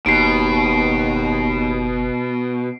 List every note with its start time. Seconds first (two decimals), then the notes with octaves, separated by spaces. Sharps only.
0.06 F#1 D#2 B2 C7 D7